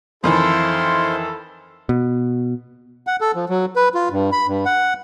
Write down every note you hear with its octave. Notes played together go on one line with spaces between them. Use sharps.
F2 D#3 E3 E4 A4 C5 F5 C6
B2
F#5
A4
F3
F#3
B4
F4
G2
B5
G2
F#5